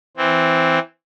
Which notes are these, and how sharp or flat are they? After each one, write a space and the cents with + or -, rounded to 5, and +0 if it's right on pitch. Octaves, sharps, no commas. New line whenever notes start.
E3 +0 C4 -5